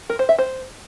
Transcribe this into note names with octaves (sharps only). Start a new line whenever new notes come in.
A#4
C5
E5
C5